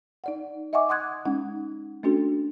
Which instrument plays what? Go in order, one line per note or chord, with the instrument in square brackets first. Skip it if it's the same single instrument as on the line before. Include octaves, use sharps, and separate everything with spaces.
[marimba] D#4 D5 F#5
D#5 E5 F#5 G#5 C#6 D6
F#5 C6 D#6 F#6 G#6
G#3 C#4 D#4 F#5
A3 C#4 D4 F#4 A4